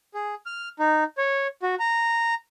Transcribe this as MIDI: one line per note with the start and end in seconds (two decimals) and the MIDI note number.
0.14 0.35 68
0.46 0.69 89
0.80 1.04 63
1.18 1.47 73
1.62 1.75 66
1.79 2.34 82